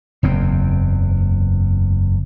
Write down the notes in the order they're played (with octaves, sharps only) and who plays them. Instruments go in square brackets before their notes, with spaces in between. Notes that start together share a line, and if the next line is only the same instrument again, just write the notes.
[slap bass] F#1 E2 C4